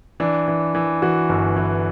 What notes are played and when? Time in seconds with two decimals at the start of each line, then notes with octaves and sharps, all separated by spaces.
0.20 E3 D4
0.48 E3
0.75 E3
1.02 E3 F#4
1.29 G1
1.56 E3